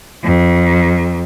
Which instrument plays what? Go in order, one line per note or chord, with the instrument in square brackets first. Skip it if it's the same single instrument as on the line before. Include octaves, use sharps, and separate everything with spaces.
[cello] F2